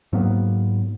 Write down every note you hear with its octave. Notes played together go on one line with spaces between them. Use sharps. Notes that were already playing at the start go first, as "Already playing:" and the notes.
G#2 F#3 A#3 B3